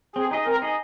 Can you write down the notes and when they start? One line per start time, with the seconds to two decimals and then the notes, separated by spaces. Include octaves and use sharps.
0.15 C4 G#4
0.31 D#4 G#4 D#5
0.46 C4 A#4
0.62 D#4 G#4 D#5